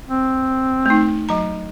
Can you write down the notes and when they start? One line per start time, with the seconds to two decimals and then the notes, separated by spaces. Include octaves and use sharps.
0.08 C4
0.86 A3 D#4
1.29 F#3 A#5